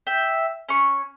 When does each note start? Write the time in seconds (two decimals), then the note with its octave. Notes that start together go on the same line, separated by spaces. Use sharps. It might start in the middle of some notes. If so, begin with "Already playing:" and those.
0.07 E5 G5
0.69 C#4 C#6